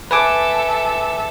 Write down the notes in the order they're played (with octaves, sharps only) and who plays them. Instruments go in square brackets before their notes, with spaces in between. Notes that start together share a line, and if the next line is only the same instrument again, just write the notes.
[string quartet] A4 E5 [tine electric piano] B4 G#5 D6